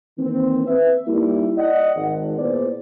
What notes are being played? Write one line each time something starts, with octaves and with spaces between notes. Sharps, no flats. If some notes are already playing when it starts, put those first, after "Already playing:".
D#3 E3 A#3 C4
B4 E5
G3 A#3 D#4 E4
D5 D#5 F#5
G#1
A#2 B3 E4 G#4 C5 D5